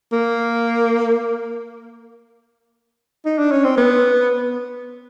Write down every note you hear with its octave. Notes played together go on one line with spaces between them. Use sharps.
A#3
D#4
D4
C#4
C4
B3